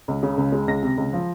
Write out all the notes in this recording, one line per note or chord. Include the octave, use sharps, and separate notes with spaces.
C#2
C#3
C#2
G#3
C#2 A#6
C3
C#2
F3